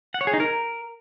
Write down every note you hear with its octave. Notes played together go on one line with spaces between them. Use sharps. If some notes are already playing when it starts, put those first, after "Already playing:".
F#5
C#5
G#4
D#4
A#4